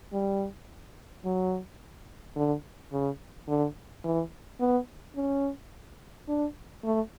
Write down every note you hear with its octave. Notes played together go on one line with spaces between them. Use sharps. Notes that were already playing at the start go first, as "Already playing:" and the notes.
G3
F#3
D3
C#3
D3
E3
B3
C#4
D4
A3